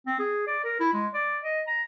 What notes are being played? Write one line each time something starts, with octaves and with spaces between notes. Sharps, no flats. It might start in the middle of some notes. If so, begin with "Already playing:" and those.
C4
G#4
D5
A#4
E4
G#3
D5
D#5
A#5